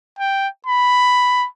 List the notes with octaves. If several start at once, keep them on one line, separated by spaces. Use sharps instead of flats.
G5
B5